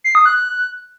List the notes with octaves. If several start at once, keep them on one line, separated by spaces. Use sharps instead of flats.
C7
D#6
F#6